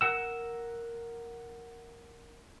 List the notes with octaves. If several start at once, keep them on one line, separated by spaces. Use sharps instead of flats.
A#4 F#5 E6